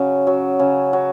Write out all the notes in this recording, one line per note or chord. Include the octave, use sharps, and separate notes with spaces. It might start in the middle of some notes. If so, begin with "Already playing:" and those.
Already playing: C#3 F#3
F#3
C#3
F#3